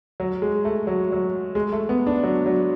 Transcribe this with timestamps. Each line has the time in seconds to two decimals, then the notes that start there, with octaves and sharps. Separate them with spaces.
0.20 F#3
0.42 G#3
0.65 A3
0.87 F#3
1.12 F#3
1.55 G#3
1.72 A3
1.89 B3
2.07 D4
2.23 F#3
2.46 F#3